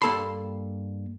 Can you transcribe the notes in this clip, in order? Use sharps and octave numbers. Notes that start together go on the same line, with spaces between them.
G2 A#3 A4 A5 B5 C6